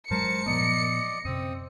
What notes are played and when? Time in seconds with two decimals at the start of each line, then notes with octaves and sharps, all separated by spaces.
0.11 G2 F#3 G#3 A#4 C5 A5 C#7
0.46 A#2 F3 B3 D5 D#5 D6
1.25 F#2 C3 C4 D#6